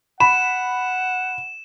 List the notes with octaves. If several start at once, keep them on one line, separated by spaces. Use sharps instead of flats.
F#5 B5 E7